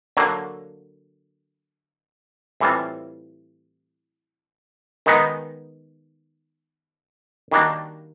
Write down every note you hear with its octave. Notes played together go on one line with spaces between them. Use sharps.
D3 F#3 A#3
A2 E3 G3 C4 F4
D#3 G#3 B3 D#4
D#3 G3 A#3 D4 F#4